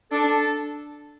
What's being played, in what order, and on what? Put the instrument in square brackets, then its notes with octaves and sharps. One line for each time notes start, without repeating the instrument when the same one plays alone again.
[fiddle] D4 [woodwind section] A4